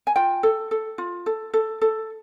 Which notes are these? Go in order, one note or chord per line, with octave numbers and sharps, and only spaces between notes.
G#5
F4 G5
A4
A4
F4
A4
A4
A4